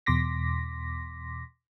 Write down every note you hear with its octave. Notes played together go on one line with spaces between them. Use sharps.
E2 B2 C6 D6 A#6 B6